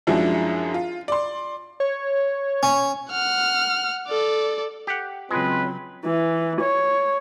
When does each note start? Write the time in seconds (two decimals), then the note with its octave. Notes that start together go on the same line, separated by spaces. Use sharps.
0.07 F#2 F3 G#3 D4 E4 F#4
0.74 F4
1.08 D5 C6
1.80 C#5
2.63 C#4
3.11 F#5 F6
4.08 A4 D5
4.87 G4 F#5
5.31 C#3 F#3 G#3 C4 F4 B4
6.05 E3
6.60 C#5